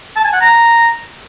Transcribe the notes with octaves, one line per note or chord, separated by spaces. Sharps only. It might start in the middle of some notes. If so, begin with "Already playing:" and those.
A5
G#5
F#5
A#5